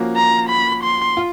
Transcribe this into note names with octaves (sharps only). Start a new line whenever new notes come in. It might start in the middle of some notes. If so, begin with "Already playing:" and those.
Already playing: F3 A#3 C#4 F#4
A#5
B5
C6
F4